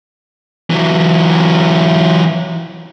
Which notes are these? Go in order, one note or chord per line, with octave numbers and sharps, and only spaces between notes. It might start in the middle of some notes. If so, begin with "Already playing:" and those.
E3 F#3